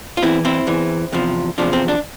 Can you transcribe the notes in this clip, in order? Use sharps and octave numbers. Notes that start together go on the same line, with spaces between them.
F4
E2 E3 C4 E4
C4 E4
E2 E3
E2 C3 F3
E2 C3 F3 D4
C4
D4